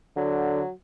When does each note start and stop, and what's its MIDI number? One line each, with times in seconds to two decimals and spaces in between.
0.17 0.60 50
0.17 0.70 54